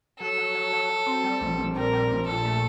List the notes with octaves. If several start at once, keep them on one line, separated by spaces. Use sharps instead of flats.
F#3 A4
F#3
F#3
F#3
F#3
C4
G3
A#1
A#1
G3 A#4
G3
A#1
A#2 A4
A3